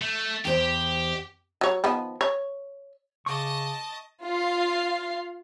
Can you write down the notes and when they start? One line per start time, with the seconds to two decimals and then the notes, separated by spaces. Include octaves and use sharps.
0.01 A3
0.45 E2 G4 C5 D#5
1.61 F#3 C#5
1.84 D#3 F3 B3
2.21 C#5
3.26 C#3 D#5 A5 C#6 D6
4.23 F4 F5